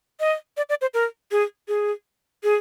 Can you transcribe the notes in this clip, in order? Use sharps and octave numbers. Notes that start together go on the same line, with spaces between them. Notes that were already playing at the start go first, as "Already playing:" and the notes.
D#5
D5
D5
C5
A#4
G#4
G#4
G#4